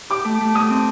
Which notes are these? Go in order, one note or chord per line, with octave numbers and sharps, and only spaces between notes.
G4 D6
A3
A3
A3 D#6
C4